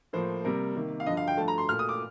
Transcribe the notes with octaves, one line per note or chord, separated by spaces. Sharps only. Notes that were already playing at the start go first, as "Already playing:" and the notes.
A2 F3 A#3 C5
C3 G3 A#3 A#4
C3 D#3 A#3
F5
G2 D3 F3 D#5
F5
G5
G2 F3 A3 A5
A#5
C6
A#2 A3 F6
D#6
D6